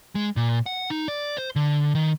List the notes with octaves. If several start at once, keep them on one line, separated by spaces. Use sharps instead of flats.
G#3
A#2
F#5
D#4
D5
C5
D3
D#3